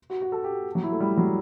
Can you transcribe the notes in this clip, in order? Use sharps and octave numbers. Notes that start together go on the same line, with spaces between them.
F#4
F#4
A4
G4
F#3
E4
A3
G3
F#3